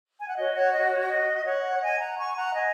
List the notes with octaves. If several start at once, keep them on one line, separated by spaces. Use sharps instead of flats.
G#5
F#5
F#4 C#5 D#5
C#5 F#5
D#5
C#5
D#5
C#5 F#5
D#5 G#5
F#5 A#5
G#5 C#6
F#5 A#5
D#5 G#5